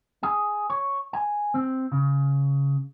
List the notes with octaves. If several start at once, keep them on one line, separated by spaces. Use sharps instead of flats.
G#4
C#5
G#5
C4
C#3